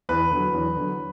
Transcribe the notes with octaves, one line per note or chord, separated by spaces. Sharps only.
E2 B4
D3 F#3
E2
D3 F#3